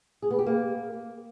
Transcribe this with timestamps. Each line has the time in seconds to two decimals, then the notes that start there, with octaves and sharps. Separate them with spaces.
0.22 G#4
0.30 B3
0.38 G4
0.46 A#3